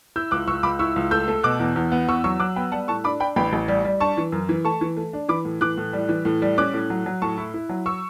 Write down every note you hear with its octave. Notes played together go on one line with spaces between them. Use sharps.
E4 E6 G6
C#2 D6 F#6
C#2 C#6 E6
C#2 B5 D6
E4 C#6 E6
C#2
A3 E6 G6
A3
B2 D6 F#6
E2
E2
B3
E2 C#6 E6
F#3 C#6 E6
F#3 D6 F#6
B3 G5 B5
G3 F#5 A5
A2 A5 C#6
D4 B5 D6
D4 G5 B5
A1 G5 B5
A1
G3
G3
D4 A5 C#6
E3
F#2
E3
A3 A5 C#6
E3
A3
D4
E3 B5 D6
A2
E3 D6 F#6
A2
G3
E3
A2
G3
C#4 D6 F#6
A2
F#3
F#3
A2 A5 C#6
E4
E4
F#3
C#6 E6